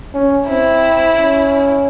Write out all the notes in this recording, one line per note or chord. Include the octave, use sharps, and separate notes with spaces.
C#4
C4 E4
C#4